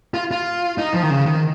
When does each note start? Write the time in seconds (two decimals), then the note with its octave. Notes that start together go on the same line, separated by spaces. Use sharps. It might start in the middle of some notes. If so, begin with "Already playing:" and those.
0.14 F4
0.31 F4
0.78 D#4
0.94 F3
1.03 D#3
1.10 C#3
1.26 D#3